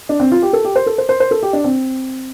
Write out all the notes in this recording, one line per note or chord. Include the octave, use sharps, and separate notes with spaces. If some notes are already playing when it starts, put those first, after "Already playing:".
D4
C4
F4
G4
A4
G4
C5
A4
C5
C5
C5
A4
G4
D4
C4